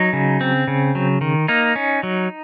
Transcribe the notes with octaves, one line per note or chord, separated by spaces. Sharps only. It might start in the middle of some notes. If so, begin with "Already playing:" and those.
Already playing: F#3 D#4
C#3
C4
C#3
F#3
D#3
A#3 D#4
C#4
F#3